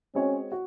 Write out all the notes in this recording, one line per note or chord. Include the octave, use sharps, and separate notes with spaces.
G#3 C4 C#4 F#4 C#5
F#4